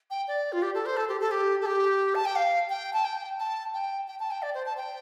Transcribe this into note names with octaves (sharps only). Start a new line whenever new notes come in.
G5
D5
F4
G4
A4
C5
A4
G4
A4
G4
A4
G4
A5
G5
F5
G5
A5
G5
A5
G5
G5
A5
G5
D5
C5
A5
G5